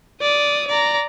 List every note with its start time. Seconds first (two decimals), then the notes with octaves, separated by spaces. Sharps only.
0.22 D5 D#6
0.68 D5 A#5